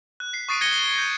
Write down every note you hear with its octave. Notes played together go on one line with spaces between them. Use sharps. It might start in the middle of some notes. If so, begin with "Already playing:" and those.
F#6
B6 C7
C#6 D#6 A6 C7 D7 D#7
G#6 A#6 C#7 D#7 G7
G7
G6 A#6